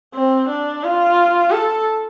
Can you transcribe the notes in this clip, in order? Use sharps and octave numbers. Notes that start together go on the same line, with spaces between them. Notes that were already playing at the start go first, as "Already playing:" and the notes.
C4
D4
F4
A4